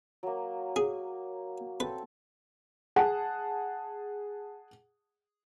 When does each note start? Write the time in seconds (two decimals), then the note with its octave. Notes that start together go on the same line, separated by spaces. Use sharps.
0.23 F#3 A#3
0.76 G#4
1.80 C4 A4 B4 A5
2.96 G#4 F#5 A5